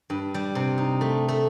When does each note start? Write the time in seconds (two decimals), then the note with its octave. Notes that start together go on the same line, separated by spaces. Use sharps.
0.10 G2
0.34 G3
0.55 C3
0.78 D#4
1.01 A3
1.28 A3